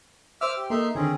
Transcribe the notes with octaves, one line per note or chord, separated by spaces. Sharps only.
C5 E5 D6 E6 F6
G4
A#3 D#4 A4 E5 C6
D3 D#3 C4 C#4 G#4